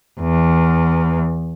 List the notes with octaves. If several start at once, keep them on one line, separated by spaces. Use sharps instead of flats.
E2